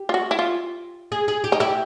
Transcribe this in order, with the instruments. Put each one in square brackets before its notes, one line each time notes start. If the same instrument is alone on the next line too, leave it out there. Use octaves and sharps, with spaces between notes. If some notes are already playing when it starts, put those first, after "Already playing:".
Already playing: [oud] G4
[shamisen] F4
F#4
E4
F4
[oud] G#4
G#4
G4
[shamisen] D#4
[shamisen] E4 [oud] G4